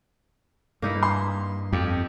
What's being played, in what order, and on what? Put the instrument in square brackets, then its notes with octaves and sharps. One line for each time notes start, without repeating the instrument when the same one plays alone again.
[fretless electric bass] G2 [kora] A#3 D#4 E4
[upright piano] C6
[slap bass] F2 [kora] G4